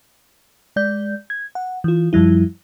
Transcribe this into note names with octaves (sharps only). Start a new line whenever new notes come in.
G#3 D5 G6
G#6
F#5
E3 F4
F#2 F3 G3 E4